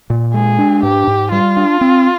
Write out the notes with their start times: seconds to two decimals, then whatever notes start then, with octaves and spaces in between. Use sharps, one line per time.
0.10 A#2
0.34 G#3 G#4
0.59 D4
0.83 G#2 G4
1.07 G#2
1.32 G3 F4
1.57 D4
1.81 C4